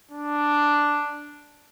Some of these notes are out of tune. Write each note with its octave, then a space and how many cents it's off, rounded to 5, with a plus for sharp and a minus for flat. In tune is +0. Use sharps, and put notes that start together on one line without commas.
D4 +0